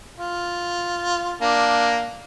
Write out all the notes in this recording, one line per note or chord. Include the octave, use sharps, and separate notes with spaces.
F4
A#3 D4 F5